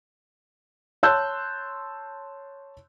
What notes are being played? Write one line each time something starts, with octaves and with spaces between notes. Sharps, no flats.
C#5 A5 C6 E6 F#6 G6